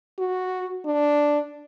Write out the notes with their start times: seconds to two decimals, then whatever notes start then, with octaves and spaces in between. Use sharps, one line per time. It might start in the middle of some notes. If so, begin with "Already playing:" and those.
0.18 F#4
0.85 D4